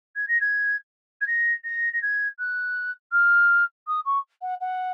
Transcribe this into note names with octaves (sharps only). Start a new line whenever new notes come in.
G#6
A#6
G#6
G#6
A#6
A#6
A#6
G#6
F#6
F6
D#6
C#6
F#5
F#5